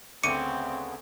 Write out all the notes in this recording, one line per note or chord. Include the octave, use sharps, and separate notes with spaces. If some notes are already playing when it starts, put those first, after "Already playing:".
D2 C#3 B3 C4 D6 C#7 D#7